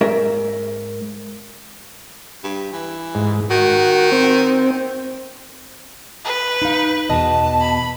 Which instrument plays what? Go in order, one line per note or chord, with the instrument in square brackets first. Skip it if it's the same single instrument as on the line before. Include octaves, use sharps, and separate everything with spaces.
[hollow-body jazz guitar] G#2 A#4 E5
[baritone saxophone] G2
E3
[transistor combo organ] G#2
[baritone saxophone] D#3 [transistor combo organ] F#4
[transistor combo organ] C4
[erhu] B4
[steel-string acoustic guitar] D#4 F5
[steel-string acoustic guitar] E2 B2 D#5 [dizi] A5
[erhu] B5